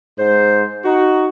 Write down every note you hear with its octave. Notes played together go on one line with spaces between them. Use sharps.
G#2 C5
D#4 F#4